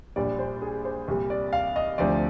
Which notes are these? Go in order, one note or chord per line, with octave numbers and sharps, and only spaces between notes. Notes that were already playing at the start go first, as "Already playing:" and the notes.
A#1 A#2 G3 D5
C5
G#4
C5
C2 A#2 G3
D5
F5
D#5
D2 C3 F3 D5